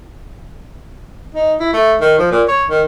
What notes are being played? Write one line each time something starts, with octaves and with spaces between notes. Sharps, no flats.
D#4
E4
A3
D#3
F3
A#2
C#5
D#3